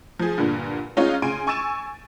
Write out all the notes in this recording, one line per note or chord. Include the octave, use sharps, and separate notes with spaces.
F3 G#4
G2 A#2 D3
G#3 C#4 D#4 F4 C#5 F5
C#3 G#5 C6 D7 D#7
G#5 C#6 E6 A6 D#7 E7